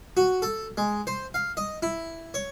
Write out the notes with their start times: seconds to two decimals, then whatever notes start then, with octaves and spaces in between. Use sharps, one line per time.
0.17 F#4
0.42 A4
0.77 G#3
1.07 C5
1.34 F5
1.57 D#5
1.83 E4
2.34 C#5